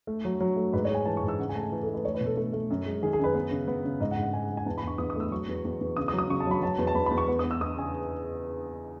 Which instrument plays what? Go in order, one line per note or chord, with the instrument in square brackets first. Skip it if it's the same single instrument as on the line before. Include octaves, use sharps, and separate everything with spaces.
[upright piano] A3
F#3
F#3
A3
G#2 B4
C#5
G#3 G#5
E3 A5
C#6
G#2
E6
C#3 F#5
G#5
A3 A5
G#5
E3
A4
A3
B4
A3 C#5
B4
B2
A4
A3 A4
A3
F#2
G#3
D#3 G#4
G#4
F#2 B4
B3
C#3
B3
C#3
G#2 D#5
F#5
G#2
F#5
G#2 G#5
G#2
G#5
E2 A5
B5
E2 C#6
E2 D#6
D#6
A3 E6
F#3 C#6
E2
E2
E2
C#3 D#6
D#6
F#3
D#6
C#3 C#6
A5
F#3 B5
F#3 A5
E2
A5
E2 B5
B5
E2
C#6
B3
D#6
B3
E6
B3 D#6
C#3 G#5